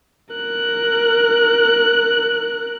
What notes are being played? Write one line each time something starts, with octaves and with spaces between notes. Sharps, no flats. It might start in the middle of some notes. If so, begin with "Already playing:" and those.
A#4 F#6